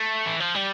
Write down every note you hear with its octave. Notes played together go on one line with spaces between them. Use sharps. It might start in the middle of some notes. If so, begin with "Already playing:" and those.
Already playing: A3
E3
F3
G3